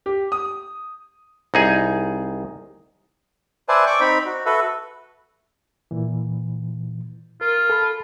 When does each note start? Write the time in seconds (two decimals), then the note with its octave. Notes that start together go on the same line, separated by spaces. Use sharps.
0.06 G4
0.32 D#6
1.54 C2 D#4 G#4
3.69 B4 C5 D5 E5 G#5 A5
3.87 D5 G5 C#6 D6
4.01 C4 D#4 B5
4.26 F#4
4.46 F#4 A4 B4 E5
5.91 A#2 E3
7.41 F4 A#4
7.70 A4 A5 B5